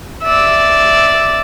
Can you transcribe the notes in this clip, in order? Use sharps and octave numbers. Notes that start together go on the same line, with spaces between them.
D5 E5